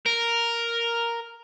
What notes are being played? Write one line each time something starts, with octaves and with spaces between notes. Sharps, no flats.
A#4